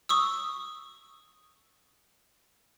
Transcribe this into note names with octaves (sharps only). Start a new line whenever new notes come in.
C#6 D#6 E6